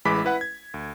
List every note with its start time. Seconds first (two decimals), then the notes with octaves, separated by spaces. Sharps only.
0.05 A1 E3 G#3 B5 D6 B6
0.25 E4 B4 F#5
0.41 G#6
0.74 D2